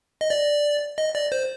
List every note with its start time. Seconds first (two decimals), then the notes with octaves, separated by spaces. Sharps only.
0.21 D#5
0.30 D5
0.98 D#5
1.15 D5
1.32 C5